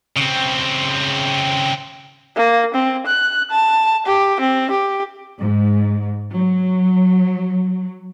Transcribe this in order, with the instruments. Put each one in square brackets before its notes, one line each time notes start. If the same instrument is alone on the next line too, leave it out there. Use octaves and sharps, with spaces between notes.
[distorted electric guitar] C#3 C4
[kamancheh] A#3
C4
F#6
A5
G4
C4
G4
[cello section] G#2
F#3